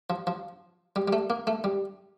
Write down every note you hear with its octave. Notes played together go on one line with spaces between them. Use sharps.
F3
F3
G3
G3
A3
A#3
A3
G3